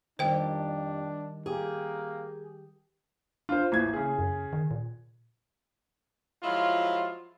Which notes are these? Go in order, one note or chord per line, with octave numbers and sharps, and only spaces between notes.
F2 D#3 G3 D4 G4 C5 G5
A#3 G4 G#4
D4 F4 C5
A1 A#3 G#6
C#3 G#4
F#2
D#3
A#2
F3 F#3 G#3 E4 F4